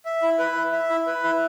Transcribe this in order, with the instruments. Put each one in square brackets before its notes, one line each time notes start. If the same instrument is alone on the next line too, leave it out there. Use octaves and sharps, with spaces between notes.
[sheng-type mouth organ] E5
E4
B4
E4
E5
E4
B4
E4